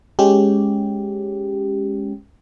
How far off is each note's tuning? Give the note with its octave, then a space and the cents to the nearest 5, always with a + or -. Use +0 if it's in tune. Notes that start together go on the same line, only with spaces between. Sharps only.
G#3 +0 C#4 +0 G4 -5